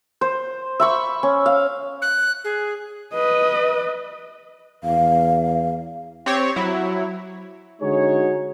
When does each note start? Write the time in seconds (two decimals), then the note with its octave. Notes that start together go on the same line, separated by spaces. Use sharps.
0.21 C5
0.80 E5 B5 C#6
1.23 C#4
1.46 F5
2.02 F#6
2.44 G#4
3.15 B4 D#5
4.84 E2 F5
6.26 C4 G4 C#5
6.56 F#3 E4
7.81 D3 G#3 D#4 F#4 G#4 C#5